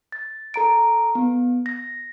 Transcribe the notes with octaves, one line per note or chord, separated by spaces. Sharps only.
A6
A4 A#5 D7
B3
A#6